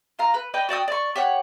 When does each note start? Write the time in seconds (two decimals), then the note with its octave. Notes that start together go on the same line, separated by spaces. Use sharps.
0.19 F4 F5 A#5
0.34 B4
0.54 B4 D5 D#5 G5
0.69 F#4 D5 G5 D#6
0.88 D5 C#6
1.16 G4 C#5 F#5